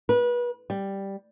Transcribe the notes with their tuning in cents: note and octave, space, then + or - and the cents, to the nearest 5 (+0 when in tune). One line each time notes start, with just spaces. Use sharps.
B4 -30
G3 +0